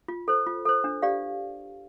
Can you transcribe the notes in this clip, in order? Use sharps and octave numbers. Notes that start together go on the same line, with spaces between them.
F4
A4 C5
F4
A4 C5
D4
G4 D5 F5